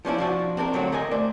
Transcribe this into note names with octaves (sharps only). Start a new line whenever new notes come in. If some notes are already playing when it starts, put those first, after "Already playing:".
F3 C#4 D4 E4
F3 D4 F#4
C4 D4 A4 A#4
D3 F#3 A3 C4 F#4
G4 A#4 D#5 G#5
A3 C5 D5